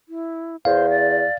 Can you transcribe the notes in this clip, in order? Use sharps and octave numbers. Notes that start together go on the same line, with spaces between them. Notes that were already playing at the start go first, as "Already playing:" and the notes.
E4
E2 C5 F5
D5